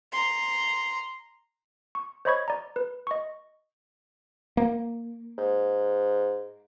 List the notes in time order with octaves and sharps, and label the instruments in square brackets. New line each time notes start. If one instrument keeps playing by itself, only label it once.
[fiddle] A#5 C6
[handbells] C#6
C5 C#5 D#5 B5 C#6 G#6
D5 A#5
B4
D#5 C#6
[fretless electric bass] A#3
[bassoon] G#2